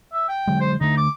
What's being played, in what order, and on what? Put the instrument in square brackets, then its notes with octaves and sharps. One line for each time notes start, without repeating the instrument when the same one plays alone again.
[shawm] E5
G5
[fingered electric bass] D3 F#3 G#3
[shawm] C5
[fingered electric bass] D3 A3 [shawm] D#4
[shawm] D6